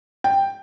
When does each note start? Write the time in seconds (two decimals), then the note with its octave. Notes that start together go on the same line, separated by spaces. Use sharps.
0.24 G5